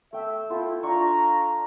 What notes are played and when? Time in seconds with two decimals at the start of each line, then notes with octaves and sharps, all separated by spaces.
0.13 A3 E5 G5
0.50 E4 F4 A4 G5
0.83 D4 F4 A#5 C#6